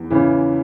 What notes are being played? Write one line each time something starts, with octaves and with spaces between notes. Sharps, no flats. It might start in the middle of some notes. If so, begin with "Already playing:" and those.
Already playing: E2
C#3 E3